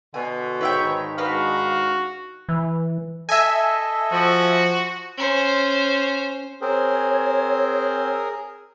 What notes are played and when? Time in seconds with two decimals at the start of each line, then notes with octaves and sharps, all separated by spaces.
0.14 B2 D3 G#5
0.61 G#2 D#3 B4 C#5 E5 G5
1.18 D4 D#4 F#4 A#4 B4 D#5 F5
2.49 E3
3.29 A4 D#5 E5 G#5
4.12 F3 F#4
5.17 C#4 C5
6.61 C4 G#4 A#4 C5 C#5